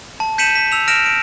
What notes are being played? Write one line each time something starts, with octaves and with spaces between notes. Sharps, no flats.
A5
G6 B6 C#7 D#7 E7 F#7
B6
E6 F7
F6 A#6 D7 E7 F7
D7